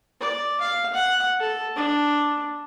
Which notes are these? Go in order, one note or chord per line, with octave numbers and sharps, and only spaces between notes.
D5
F5
F#5
A4
D4